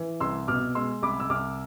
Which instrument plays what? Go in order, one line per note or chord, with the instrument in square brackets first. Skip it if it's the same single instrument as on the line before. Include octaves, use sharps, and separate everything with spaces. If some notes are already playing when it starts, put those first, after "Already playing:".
Already playing: [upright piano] E3
C2 C6 E6
B2 D6 F6
G#3 C6 E6
C2 B5 D6
E6
C2 D6 F6